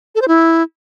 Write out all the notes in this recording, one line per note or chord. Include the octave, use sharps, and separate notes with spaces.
A4
C5
E4